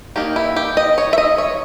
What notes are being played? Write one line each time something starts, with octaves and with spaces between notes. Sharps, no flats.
D#3 A#3 D#4 G4
E4
G4
D#5
C#5
E5
D#5
C#5